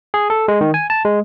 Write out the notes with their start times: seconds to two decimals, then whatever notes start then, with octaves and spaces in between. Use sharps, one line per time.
0.14 G#4
0.30 A4
0.48 G#3
0.61 D#3
0.74 G#5
0.90 A5
1.05 G#3